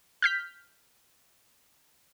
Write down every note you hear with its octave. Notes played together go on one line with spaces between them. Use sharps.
F6 G6 B6